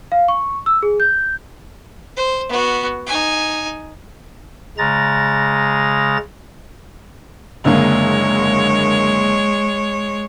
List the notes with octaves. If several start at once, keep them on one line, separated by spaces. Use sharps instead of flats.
F5
C#6
E6
G#4
G6
C5
B3 F#4
D#4 G#5
C#3 G#3 A#5 A6
F#1 D3 G#3 A#3 C#5